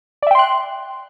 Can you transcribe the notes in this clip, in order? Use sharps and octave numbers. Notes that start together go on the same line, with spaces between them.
D5 E5 G5 C6 F#6